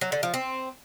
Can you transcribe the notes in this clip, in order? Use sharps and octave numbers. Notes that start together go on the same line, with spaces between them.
F#3
D3
F3
C4